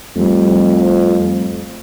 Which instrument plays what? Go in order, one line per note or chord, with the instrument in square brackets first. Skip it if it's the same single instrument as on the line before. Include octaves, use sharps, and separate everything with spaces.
[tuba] F2 [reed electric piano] G3 A3